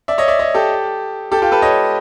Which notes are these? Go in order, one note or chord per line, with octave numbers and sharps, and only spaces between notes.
D5 E5
C#5 D#5
D5 E5
C#5 D#5
G4 A4
G4 A4
F4 G4
A4 B4
C#5 D#5